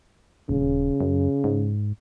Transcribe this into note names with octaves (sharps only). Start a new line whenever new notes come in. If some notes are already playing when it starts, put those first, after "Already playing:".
D#1 C#3
F#2
G#2